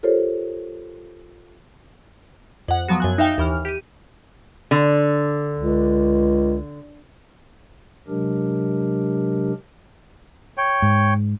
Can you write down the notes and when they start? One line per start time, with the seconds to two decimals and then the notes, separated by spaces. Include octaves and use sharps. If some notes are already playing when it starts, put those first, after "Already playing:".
0.03 F4 G4 A4 A#4 C5 C#5
2.68 F2 F#5
2.89 F3 F#3 B3 F#4
3.00 F#2 G#5 F#6
3.18 D#4 E5 F5 G5
3.38 D#2 E3 F6
3.65 G4 D#7
4.71 D3
5.56 C#2
8.08 C3 F#3 G#3 D4 G4 A#4
10.57 C#5 G5
10.82 G#2